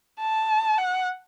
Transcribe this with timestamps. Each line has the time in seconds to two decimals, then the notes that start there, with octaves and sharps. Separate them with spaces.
0.20 A5
0.78 F#5